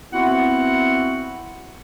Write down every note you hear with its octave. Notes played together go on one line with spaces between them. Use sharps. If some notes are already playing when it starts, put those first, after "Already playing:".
B3 C4 E4 F#4 F#5